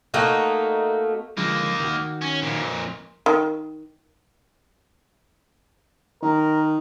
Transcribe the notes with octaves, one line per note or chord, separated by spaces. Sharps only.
A3 A#3 D#4 F#4
D3 F3 G#3 A#3 D#4
D#3 F#4
C#4
F2 A#2
D#3
D#3 A#4